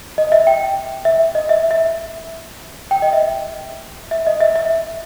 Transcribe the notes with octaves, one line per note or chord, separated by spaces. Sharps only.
D#5
E5
G5
E5
D#5
E5
E5
G5
D#5
E5
E5
D#5
E5
E5